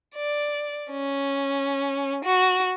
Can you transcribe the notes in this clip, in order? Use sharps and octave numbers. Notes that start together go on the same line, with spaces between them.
D5
C#4
F#4